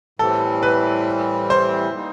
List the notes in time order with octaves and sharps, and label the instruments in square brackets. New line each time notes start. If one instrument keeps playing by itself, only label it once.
[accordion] A2 E3 G3 C4 [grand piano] A4
[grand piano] B4
C5
[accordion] G3 A#3 D#4